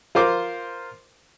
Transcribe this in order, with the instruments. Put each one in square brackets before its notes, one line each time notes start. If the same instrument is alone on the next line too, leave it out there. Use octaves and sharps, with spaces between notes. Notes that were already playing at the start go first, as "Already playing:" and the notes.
[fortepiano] F4 A#4 C5 D6